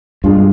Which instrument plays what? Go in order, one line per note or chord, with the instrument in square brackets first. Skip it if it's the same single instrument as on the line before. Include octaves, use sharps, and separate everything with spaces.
[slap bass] G2 [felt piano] B2 G#3 D4 F4